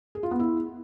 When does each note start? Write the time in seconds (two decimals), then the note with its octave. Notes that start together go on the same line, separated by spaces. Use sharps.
0.15 G#4
0.23 F4
0.31 B3
0.39 E4